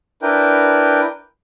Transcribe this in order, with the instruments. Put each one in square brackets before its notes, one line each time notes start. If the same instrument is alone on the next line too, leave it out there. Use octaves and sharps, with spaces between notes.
[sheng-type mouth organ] D4 E4 A#4 B4 G5